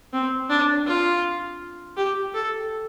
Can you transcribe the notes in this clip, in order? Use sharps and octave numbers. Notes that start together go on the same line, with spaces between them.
C4
D4
F4
G4
A4